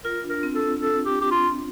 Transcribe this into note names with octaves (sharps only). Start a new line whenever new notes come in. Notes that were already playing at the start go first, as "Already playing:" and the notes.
F4 A#4
D4
A#4
C4
A4
C4
A4
G4
G4
F4